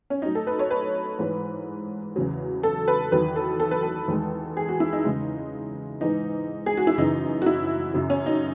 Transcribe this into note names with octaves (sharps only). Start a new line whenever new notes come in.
C#4
A2 F#3 D#4
A4
B4
C#5
B4
G#2 E3 G#3
E2 C#3 F#3
A4
B4
E2 D#3 F#3 B4
A4
A4
B4
A4
E2 D#3 G#3
G#4
F#4
E4
D#4
E2 C#3 G#3
G#2 E3 G#3 D#4
G#4
F#4
E4
F#2 C#3 E3 D#4
F#4
E4
F#2 C#3 F#3
C#4
D#4